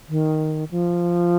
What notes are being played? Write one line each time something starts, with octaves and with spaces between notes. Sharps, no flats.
D#3
F3